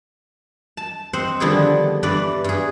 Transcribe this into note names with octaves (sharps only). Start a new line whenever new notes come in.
A5
C4 C5 D#5 F#5
D3 D#3 F3 G3 B3 G#4
G2 E3 B4 D5
G2 G#4